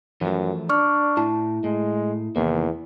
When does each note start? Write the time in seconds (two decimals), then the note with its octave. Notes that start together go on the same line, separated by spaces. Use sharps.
0.21 F#2 E3 F3 A3
0.69 D4 D5 C#6 F6
1.17 A2 E4 A5
1.64 A2 G#3
2.36 E2 C3 D#3 A#3